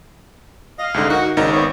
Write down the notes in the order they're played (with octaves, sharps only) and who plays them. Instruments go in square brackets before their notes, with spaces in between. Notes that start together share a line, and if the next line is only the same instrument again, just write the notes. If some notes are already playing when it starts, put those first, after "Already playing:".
[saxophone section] D#5 F5
[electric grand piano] C2 G#2 D3
[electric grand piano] D#4 A#4 [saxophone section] F#4
[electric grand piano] G#1 D#4 A#4 [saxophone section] C#3 D4
[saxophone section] B3 C4 C#5